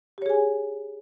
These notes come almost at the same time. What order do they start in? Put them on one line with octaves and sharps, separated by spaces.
G4 C#5 G#4 G#5